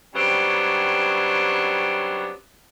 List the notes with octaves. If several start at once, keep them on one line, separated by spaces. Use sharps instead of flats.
C#3 F#3 G3 B3 C4 D4